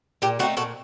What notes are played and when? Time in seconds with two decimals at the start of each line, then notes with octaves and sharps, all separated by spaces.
0.22 A#2 G4
0.39 A3 C4 D#4 F#4
0.57 A#2 F#4 A4